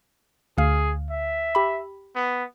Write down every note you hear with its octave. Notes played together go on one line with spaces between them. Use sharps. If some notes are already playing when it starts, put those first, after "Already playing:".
D2 G#4 F5
E5
G4 B5
B3